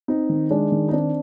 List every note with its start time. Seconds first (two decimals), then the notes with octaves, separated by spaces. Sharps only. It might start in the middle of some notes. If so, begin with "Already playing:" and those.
0.08 C4 D#4
0.29 D#3
0.51 G#3 D4
0.72 D#3
0.89 D#4
0.92 C4 D4